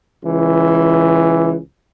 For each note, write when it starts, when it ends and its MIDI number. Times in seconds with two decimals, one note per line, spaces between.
0.24 1.57 37
0.24 1.57 52